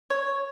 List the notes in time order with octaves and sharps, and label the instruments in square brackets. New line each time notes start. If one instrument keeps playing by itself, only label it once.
[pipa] C#5